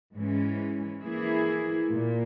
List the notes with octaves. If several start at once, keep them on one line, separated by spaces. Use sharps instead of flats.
G#2 E3 G#3 C#4
E3 A#3 E4 G#4
A#2